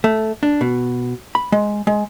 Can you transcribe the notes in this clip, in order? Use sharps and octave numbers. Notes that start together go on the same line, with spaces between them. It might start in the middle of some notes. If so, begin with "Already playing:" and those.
A3
D4
B2
B5
G#3
G#3